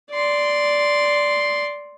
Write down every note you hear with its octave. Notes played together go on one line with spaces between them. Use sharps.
D5 C6